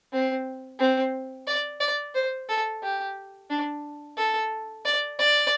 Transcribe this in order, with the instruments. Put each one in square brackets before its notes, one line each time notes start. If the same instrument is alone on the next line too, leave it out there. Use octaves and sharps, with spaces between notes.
[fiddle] C4
C4
D5
D5
C5
A4
G4
D4
A4
D5
D5